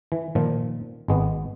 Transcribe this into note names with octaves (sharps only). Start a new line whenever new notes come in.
E3
A#2 D#3 F3
G#1 G#3 B3